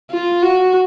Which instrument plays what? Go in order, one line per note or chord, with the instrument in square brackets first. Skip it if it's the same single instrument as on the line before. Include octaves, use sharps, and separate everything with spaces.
[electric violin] F4
F#4